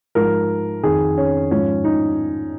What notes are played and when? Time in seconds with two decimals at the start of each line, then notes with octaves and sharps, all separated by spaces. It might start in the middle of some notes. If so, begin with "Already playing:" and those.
0.15 G#2 F3 A#4
0.83 F2 D#3 G#4
1.18 C#4
1.51 G#2 F3 C#4
1.84 D#4